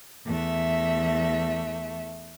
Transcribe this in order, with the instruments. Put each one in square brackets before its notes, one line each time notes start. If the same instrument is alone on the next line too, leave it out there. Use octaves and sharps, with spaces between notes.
[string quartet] E2 A3 E5